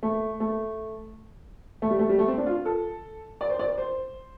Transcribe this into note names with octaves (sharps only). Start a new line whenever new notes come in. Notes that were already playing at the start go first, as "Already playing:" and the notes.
A3
A3
A3
G3
A3
G3
A3
C4
D4
F4
A4
D5
C5
D5
C5